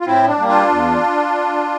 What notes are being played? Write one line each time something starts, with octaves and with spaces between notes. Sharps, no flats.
F4
A2 C4 E4
D4
G3 A#3
D4 F4
E2